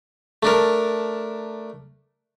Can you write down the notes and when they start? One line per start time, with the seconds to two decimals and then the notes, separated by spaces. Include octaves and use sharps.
0.43 A3 D4 A#4